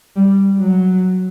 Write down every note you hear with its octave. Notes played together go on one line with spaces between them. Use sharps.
G3
F#3